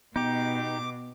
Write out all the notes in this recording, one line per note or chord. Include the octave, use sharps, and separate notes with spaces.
B2 B3 D#4 G4 D6